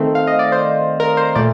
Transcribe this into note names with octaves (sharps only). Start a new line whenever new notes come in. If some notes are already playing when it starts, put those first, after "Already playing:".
Already playing: D#3 A3 C4
F5
D#5
D5
C5
A#4
C5
A#2 A3 D5